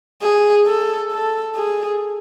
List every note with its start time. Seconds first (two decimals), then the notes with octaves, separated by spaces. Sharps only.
0.22 G#4
0.66 A4
1.11 A4
1.55 G#4